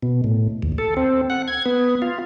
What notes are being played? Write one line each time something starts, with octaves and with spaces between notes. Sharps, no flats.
B2
A2
D#2
A4
C4
F#5
G#6
B3
F4